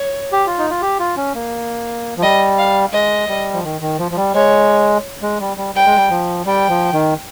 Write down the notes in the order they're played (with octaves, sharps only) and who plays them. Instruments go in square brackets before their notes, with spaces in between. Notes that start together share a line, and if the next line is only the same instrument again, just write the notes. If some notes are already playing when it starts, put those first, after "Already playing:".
Already playing: [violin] C#5
[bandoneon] G4
F4
D#4
F4
G4
F4
C#4
A#3
F3
[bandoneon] G3 [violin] D#5
[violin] F5
[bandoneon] G#3 [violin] D#5
[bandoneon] G3
F3
D#3
D#3
F3
F3
G3
[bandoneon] G#3 [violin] C#5
[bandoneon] G#3
G3
G3
[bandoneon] G3 [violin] G5
[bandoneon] G#3
G3
F3
[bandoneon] G3 [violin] G5
[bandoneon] F3
D#3